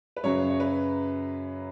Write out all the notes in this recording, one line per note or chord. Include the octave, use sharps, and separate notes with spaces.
B4
F#2 C#3 F#3 C#5
C#5
B4